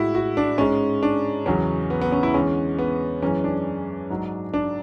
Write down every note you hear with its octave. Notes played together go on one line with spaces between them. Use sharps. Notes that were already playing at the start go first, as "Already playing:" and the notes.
Already playing: A2 G#3 E4 F#4
F#4
D4
G#2 G#3 C#4
D4
E2 C#3 F#3 C#4
B3
B3
C#4
E4
E2 D3 G#3 C#4
B3
F#2 E3 G#3 C#4
D4
G#2 F#3
D4